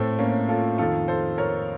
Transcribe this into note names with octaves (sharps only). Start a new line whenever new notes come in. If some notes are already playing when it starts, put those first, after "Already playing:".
Already playing: A2 A3 C4
A#3 C#4
F4 A4
F2 D#3 F4 A4
A4 C5
A#4 C#5